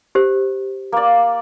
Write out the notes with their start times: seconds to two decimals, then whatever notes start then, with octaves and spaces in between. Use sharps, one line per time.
0.15 G4 C5
0.92 A#3 D5